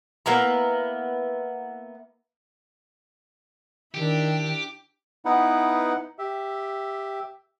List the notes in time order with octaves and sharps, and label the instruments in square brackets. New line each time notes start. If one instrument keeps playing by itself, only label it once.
[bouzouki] A#3 B3 E4 A#5
[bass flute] D#3 [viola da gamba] D4 E4 [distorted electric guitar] G4
[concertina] B3 D#4 E4 B4 F#5
G4 E5